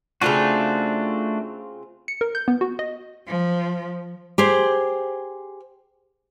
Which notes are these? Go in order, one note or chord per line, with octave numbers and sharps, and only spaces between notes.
C#3 A3 C4 D4 F4 F#4
C#7
A#4
G6
B3
F#4
D#5
F3
G4 G#4 C5